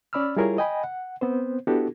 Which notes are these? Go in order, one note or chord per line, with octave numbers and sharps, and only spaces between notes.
C#4 D5 B5 E6 F6
G3 E4 F4 G#4 A#4 C#5
D#5 G5 G#5 B5
F#5
B3 C4 C5
B3 D4 E4 F#4 G4 A4